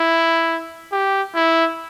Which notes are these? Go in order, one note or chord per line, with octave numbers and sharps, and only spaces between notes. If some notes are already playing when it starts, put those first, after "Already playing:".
Already playing: E4
G4
E4